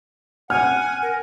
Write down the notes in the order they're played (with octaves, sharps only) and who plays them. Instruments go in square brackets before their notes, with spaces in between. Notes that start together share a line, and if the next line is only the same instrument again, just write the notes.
[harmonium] F#5 [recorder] G#5 [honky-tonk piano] F6
[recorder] A#4